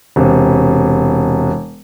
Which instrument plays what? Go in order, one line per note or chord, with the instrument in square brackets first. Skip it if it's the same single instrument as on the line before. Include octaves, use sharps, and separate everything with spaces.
[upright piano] E1 C3